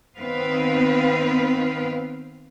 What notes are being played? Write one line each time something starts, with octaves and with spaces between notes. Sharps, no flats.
D#3 B3 C4 B4 F5